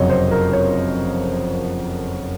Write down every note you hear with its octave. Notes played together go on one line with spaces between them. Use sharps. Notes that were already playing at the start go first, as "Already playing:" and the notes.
Already playing: F#1 F2 C3 F#3 C#5 D#5
C5
A#4
C#5